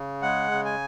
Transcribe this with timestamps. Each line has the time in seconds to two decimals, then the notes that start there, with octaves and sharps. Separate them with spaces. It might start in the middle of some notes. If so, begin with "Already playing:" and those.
Already playing: C#3
0.22 G#3 F#5
0.51 C#3
0.65 G#5